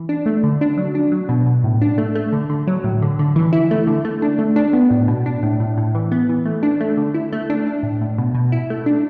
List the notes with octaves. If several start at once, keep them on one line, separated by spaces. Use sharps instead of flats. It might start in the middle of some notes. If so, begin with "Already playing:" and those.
Already playing: E3
D4
A3
D3
D4
F#3
D4
F#3
B2
B2
A2
D4
A3
A3
D3
D3
F#3
A2
D3
D3
E3
E4
A3
D3
A3
D4
A3
D4
B3
A2
B2
D4
A2
A2
A2
E3
B3
E3
A3
D4
A3
D3
E4
A3
D4
D4
A2
A2
B2
B2
E4
A3
D4